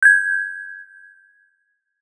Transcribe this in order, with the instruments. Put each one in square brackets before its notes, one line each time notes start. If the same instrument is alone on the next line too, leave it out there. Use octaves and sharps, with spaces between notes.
[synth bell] G6 G#6